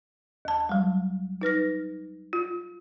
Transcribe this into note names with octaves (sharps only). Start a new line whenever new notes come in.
D#2 A5
F#3 G3
D#4 B4 F6 A#6
F4